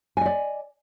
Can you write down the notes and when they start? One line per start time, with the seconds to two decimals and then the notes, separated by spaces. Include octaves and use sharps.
0.17 G#5
0.21 D#5
0.26 D5